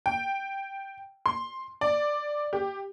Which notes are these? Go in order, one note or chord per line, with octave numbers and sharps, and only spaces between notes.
G5
C6
D5
G4